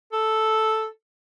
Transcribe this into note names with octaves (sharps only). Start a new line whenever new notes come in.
A4